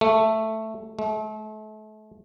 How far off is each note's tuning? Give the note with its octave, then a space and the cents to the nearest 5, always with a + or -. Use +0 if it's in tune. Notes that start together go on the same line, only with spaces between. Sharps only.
A3 +5
A3 -35